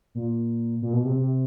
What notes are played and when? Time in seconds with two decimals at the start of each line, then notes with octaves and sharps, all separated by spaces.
0.15 A#2
0.82 A#2
0.93 B2
1.05 C3
1.16 C3